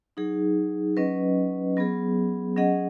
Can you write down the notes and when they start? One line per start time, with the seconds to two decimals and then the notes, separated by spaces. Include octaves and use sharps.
0.17 F#3 D#4 G#4
0.97 F#3 C#4 B4 D#5
1.77 F#3 B3 G#4
2.56 F#3 C#4 G#4 D#5 F#5